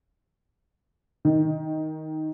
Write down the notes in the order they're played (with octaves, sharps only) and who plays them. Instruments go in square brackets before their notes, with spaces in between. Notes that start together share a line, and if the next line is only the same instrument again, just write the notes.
[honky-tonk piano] D#3